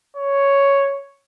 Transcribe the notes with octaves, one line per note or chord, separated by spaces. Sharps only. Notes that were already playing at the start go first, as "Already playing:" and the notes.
C#5